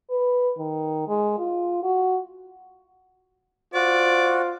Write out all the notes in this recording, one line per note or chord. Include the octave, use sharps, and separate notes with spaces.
B4
D#3
G#3
F4
F#4
F4 F#4 C5 D5